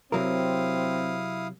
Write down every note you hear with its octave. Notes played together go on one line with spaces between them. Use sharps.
C3 F#3 C4 E4 A#4 F5 D#6